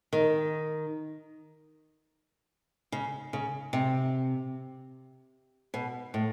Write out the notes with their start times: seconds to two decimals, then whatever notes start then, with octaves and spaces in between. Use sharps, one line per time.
0.13 D#3
2.92 C#3
3.33 C#3
3.73 C3
5.74 B2
6.14 A2